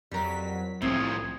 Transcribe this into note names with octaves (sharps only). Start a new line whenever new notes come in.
F2 F#3 G3 A#4 B6
C2 A2 F3 C4 G#4